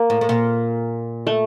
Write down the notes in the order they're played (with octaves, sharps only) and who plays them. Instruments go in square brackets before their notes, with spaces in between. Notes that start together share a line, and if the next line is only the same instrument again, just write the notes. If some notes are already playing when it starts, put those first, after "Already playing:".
Already playing: [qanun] A#3
[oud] A2
A2
A#2
[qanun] A3